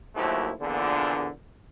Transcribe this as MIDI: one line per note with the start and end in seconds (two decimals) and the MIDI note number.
0.15 0.52 34
0.15 0.52 39
0.15 0.52 54
0.15 0.52 57
0.15 0.52 64
0.15 0.52 72
0.61 1.29 34
0.61 1.29 40
0.61 1.29 46
0.61 1.29 50